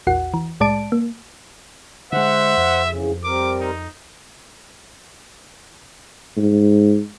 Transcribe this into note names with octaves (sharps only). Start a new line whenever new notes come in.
A#1 E2 F#4 F#5
E3
C2 A2 G#3 D5 A5 D7
A#3
D3 G#3 C5 E5 F#5
F2
E2 C#3
G3 C4 A#4 D6
D#4
G#2